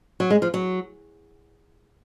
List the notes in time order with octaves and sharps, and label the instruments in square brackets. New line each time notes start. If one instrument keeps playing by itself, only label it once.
[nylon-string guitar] F#3
G#3
F3
F#3